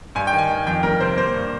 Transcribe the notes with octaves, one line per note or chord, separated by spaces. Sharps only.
G2 G#5
G5
D#3
G#5
D#3
F2 G5
G3 A#4
C3 C5
A#3 C5
G2